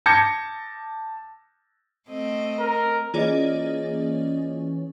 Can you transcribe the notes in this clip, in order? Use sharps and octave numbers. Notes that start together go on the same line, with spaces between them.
A5 D6 G6 G#6 A#6 C#7
A3 C4 D#5
A#4
E3 A#3 C#4 F4 G#4 D5 D#5